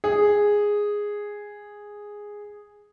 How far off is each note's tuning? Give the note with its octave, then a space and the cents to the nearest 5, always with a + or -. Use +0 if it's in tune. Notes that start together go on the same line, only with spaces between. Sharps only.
G#4 -5